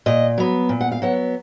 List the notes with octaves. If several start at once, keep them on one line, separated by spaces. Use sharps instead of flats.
A#2 D#5
F#3 B3
A#2
F#5
F5
F#3 B3 F#5